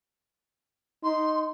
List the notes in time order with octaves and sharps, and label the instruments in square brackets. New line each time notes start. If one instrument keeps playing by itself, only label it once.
[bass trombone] D#4 [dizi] C6